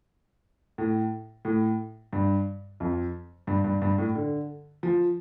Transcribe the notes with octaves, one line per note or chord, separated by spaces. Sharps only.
A2
A2
G2
F2
G2
G2
G2
A2
D3
F3